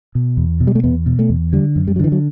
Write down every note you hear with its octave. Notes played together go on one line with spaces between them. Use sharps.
B2
E2
B2
G3
A3
E2 B3
B2
A3
E2
D3 G3
F#2
G3
F#3
D3 E3
F#3